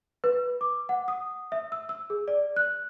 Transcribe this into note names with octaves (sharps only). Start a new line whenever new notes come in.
B4
D6
F#5
D#6
E5
E6
E6
G#4
D5
F#6